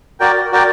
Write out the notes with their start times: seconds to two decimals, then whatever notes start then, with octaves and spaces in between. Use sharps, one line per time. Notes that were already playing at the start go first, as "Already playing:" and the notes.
0.20 F#4 A#4 D5 G5
0.52 F#4 A#4 D5 G5